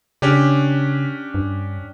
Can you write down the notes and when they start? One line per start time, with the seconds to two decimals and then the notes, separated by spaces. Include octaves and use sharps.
0.22 C#3 C#4 D4 G4
1.35 G2